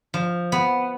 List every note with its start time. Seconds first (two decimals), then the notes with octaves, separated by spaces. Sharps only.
0.14 F3
0.52 B3